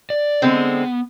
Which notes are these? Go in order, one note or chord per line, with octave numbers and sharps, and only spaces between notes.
D5
D3 G#3 B3 C4